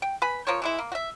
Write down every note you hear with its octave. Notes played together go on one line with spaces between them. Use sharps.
G5
B4 G#5 B5
F3 A#4 C5 C#5
E3 G#3 E4
A#3
F#4 E5